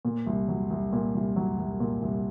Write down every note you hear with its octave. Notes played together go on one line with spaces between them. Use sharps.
A#2
C2
F#3
C2
A#2
C2
F#3
C2
A#2
C2